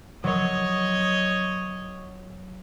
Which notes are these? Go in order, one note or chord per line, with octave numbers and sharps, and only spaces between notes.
F#3 C#5 D#5